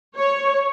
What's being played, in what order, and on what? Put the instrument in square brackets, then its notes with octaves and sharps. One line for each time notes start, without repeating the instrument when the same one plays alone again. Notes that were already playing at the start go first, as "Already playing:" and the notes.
[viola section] C#5